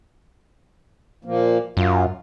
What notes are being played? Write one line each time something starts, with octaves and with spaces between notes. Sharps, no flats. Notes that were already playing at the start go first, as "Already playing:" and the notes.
A#2 F3 A#3
F#2 F4